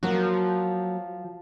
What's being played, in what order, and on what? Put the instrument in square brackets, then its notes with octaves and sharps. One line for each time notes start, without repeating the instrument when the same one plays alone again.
[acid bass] F3 [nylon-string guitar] F#3 A#3 F#4